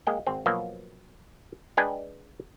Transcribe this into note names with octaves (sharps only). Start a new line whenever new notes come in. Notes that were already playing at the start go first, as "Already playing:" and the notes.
G#3 A#3 G5
G#1 C4
B2 F3 F#3 A#3
G#3 D4 B4 G5 G#5